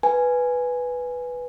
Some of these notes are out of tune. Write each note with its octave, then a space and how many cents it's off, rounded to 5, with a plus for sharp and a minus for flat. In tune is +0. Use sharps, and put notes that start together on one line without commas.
B4 +0 G#5 +0